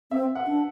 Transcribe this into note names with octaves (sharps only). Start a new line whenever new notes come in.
C4 E5
F#5
D4